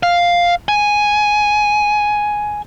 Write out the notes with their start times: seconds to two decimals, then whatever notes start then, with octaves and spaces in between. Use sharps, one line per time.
0.03 F5
0.68 G#5